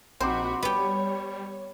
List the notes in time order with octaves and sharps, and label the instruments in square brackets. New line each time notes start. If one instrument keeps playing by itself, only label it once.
[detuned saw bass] A#1 [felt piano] C4 C6 D6 [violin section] D#4 F#4 B5 [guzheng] C5
[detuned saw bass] G3 [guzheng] B3 G4 [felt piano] B4 [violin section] C#5